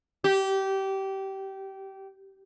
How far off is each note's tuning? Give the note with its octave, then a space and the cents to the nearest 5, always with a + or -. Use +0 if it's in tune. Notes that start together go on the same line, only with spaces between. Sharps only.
G4 -20